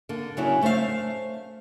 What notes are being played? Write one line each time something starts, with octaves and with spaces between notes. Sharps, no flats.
D3 A#3
C#3 F#3 C#4 D4 E4 F#4
A3 C5 E5 F5